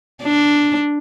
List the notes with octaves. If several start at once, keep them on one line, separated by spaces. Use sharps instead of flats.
D4